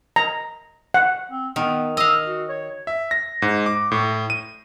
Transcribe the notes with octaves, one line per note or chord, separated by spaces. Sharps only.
A#5
F#5
C4
D#3 B3
D#5 F5 E6
F#4
C#5
E5
A#6
G#2
D6
A2
D#7